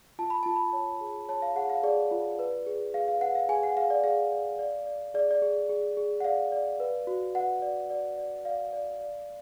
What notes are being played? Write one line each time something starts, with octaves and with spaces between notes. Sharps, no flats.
F4 A5
B5
F4 A5
B5
C#5 A5
G#4
C#5 A5
F5
G#4 F#5
F5
G#4 D5
F4
B4
G#4
G#4 F5
F5
B4 F#5
F5
G#4 G#5
F#5
G#4 F5
D5
G#4 F5
D5
D5
D5
G#4 D5
D5
G#4
G#4
G#4
F#5
D5 F5
D5
B4
F#4
B4 F#5
D5
D5
D5
D5 F5
D5
D5